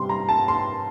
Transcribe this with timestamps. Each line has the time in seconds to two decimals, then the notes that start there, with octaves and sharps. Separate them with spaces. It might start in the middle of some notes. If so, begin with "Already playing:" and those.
Already playing: C3 G3 C6
0.09 A#5
0.29 A5
0.48 C6